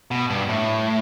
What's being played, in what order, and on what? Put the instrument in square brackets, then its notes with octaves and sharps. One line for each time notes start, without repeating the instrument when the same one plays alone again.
[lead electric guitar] B2
G2
A2